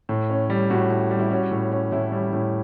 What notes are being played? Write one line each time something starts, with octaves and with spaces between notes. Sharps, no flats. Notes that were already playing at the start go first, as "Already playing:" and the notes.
A2
C#4
G3
A2 F#4
A2
G3
E4
C#4 F#4
A2
C#4
A2 E4
G3
A2